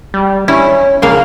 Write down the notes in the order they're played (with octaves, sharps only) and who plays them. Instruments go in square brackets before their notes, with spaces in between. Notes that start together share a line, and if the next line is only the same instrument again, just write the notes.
[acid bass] G3
[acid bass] C#4 [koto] E4
[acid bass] A#1 [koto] C#3 A#3 F5